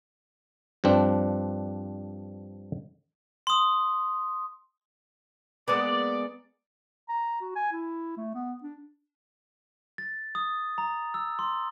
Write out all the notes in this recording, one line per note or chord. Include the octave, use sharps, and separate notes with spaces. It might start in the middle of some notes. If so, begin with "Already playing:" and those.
G2 F3 C4 D4
C6 D#6
G#3 A#3 B3 D5
A#5
F#4
G#5
E4
A3
B3
D4
A6
D#6
A#5
E6
C6